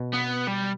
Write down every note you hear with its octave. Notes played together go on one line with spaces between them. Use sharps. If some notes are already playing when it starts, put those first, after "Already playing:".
Already playing: B2
B3
G3